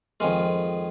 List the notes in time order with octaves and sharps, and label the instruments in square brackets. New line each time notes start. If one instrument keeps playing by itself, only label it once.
[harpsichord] F2 D#3 G#3 F5